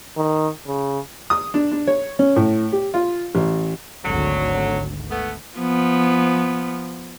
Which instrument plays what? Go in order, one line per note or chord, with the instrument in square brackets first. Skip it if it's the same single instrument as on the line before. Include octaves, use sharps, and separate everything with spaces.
[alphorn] D#3
C#3
[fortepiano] D#6
D4
D4
C#5
C#4
A2
G4
F4
A1
[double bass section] G#1 D2 [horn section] D3 F#3
[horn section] A3 B3
[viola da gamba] F3 B3